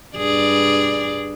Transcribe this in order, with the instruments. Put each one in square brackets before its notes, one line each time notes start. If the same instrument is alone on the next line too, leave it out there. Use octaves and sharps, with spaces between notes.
[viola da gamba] G2 G#4 D5